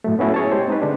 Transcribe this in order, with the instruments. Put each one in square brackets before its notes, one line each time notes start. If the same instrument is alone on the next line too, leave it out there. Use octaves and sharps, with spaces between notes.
[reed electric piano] A2 F#3 A3
B3 C#4 E4 F#4 A4
G#4 C#5 A5
G#3 G4 C5
C4 D#4 B4
D3 G#3 D4